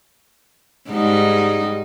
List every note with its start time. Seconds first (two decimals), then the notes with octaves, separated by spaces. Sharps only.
0.90 G#2 G3 D#4